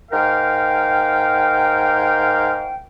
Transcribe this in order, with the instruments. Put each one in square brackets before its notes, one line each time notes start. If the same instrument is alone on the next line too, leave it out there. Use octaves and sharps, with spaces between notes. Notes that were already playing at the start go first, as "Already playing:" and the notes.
[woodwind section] G#2 A#4 F5 G5